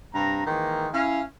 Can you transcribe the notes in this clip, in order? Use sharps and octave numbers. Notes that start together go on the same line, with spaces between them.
G2 C3 A#5
D#3 E3 G#3 A#3
C#4 E4 F5